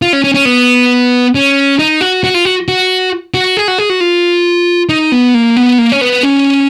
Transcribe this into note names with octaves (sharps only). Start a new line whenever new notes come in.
F4
C#4
C#4
C#4
B3
C#4
D#4
F#4
F#4
F4
F#4
F#4
F#4
G#4
F#4
G#4
F#4
F4
D#4
B3
A#3
B3
A#3
C#4
B3
C#4